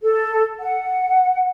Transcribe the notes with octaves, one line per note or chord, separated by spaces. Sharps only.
A4
F#5